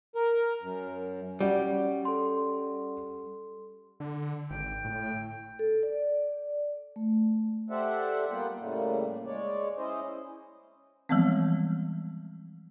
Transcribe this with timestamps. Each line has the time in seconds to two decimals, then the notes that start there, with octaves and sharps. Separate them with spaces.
0.15 A#4
0.62 F#2
1.40 G3 C#4 F#4 D5
2.05 A4 C6
4.00 D3
4.51 G#1 G5
4.84 A2
5.59 A4
5.83 D5
6.96 A3
7.70 G4 A4 C5 D5 E5 F#5
8.30 G3 A#3 B3 F4 F#5 G5
8.58 A2 C#3 G3 A3 A#3
9.25 G#3 C#5 D5
9.77 C#4 E4 C5 D#5
11.09 E3 F3 G3 G#3 B3 C4